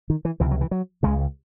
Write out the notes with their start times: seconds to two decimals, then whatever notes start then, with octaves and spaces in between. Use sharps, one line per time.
0.10 D#3
0.25 E3
0.40 C#2 C3 E3
0.51 F#3
0.61 E3
0.71 F#3
1.03 C#2 C#3 G#3